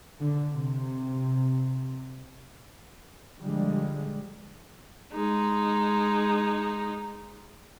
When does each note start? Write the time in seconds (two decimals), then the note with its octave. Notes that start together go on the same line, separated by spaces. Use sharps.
0.20 D3
0.51 C3
3.41 D3 F3 G3 G#3
5.14 G#3 D#4